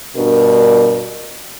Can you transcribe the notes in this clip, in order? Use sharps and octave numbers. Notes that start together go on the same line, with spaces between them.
G2 B2 D4 A#4